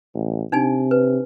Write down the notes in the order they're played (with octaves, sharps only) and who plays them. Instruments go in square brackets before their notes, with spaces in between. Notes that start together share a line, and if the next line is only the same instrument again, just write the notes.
[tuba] A1
[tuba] C3 [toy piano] D4 D#4 G#5
[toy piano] B4